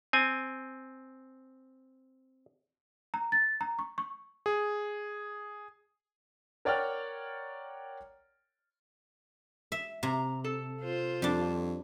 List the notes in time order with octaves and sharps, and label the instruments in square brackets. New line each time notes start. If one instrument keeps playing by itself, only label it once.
[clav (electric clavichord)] C4 G#5
[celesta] A#5
A6
A#5
C#6
C#6
[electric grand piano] G#4
[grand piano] A#4 C#5 D5 F#5 G5 F6
[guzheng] E5
[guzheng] C3 [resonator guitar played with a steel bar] A#5
[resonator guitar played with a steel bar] A4
[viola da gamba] F4 C5
[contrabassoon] F2 [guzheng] G3 D4